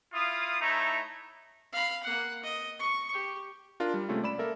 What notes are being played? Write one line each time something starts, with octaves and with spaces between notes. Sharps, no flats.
E4 F4 F5 D#6
A3 D#4 E4 C#5 E5 A#5
F5 B5
A#3 F#5
D#5
C#6
G4
D4 F4 A#4
G3
C3 G#3 A3 C#4 F4
D5 B5 E7
A#3 A4 A#4 E5